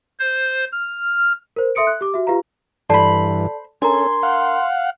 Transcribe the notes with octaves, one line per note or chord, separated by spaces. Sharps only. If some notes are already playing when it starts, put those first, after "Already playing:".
C5
F6
A#4 C5
A4 E5 C6 D#6 C#7 D7
F#6
G4 D6
F#4 E5
F4 G4 B4 F5 A#5
G2 E3 A4 C5 D5 A5 B5
C#4 D4 A4 A#4 G#5 A#5 C6
F5 F#5